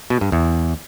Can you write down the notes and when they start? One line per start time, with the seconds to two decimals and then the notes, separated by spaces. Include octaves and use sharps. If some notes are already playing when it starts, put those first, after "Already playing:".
0.10 B2
0.21 G2
0.32 E2